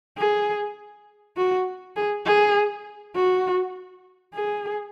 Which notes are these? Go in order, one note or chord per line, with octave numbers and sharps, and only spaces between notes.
G#4
F#4
G#4
G#4
F#4
G#4